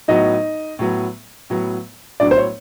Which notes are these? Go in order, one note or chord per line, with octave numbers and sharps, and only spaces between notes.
A2 F#3 B3 D#4 D#5
A2 F#3 B3
A2 F#3 B3
A2 F#3 B3 D4 D5
C5
C#5